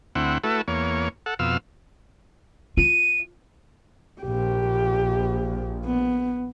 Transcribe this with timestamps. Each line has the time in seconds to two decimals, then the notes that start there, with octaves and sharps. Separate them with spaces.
0.15 D2 C4 E4 F#5
0.44 A3 E4 F#4 A4 B4
0.68 E2 A#3 C#5
1.26 A4 F#5
1.39 F2 B2 F5 E6
2.77 F4 D#7
4.22 A#1 G4
5.86 B3